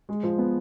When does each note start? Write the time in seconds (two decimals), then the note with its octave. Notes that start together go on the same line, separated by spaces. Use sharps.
0.09 G#3
0.23 F3
0.38 B3